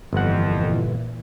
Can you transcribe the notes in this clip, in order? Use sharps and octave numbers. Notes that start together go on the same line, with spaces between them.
G1 F2 A#2 E3 F3 F#5